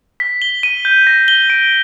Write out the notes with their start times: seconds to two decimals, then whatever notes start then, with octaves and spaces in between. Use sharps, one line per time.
0.20 B6
0.42 G7
0.63 D#7
0.85 G6
1.07 A#6
1.28 G7
1.50 D7